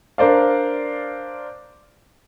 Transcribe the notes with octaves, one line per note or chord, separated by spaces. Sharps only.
D4 A#4 C5 D5 F5